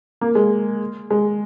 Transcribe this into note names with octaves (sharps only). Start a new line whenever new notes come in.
A#3
G#3
G#3